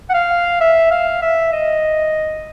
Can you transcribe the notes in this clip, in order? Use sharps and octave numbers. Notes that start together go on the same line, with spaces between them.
F#5
F5
E5
F5
E5
D#5